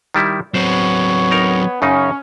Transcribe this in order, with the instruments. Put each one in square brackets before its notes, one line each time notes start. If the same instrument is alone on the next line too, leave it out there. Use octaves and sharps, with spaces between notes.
[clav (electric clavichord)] D#3 G3 E4
[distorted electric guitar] F#3 C4 [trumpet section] B3 C#5 [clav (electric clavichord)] C5
[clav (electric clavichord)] D#4 A#4
[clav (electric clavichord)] F#2 C#3 D#4 [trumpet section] C#4